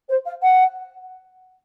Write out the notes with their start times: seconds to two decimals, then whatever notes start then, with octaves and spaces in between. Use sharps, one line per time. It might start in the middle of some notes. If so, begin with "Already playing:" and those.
0.08 C5
0.25 F5
0.42 F#5